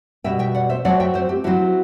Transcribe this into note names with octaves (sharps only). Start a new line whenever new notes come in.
B2 G3 B3 E5 G5
E5 G5
D5 F#5
C5 E5
F#3 A3 C4 D5 F#5
E5 G5
C5 E5
G4
F#3 C4 E4 F#4